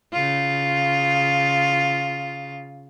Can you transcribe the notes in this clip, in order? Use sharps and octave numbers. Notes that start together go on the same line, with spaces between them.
C#3 F4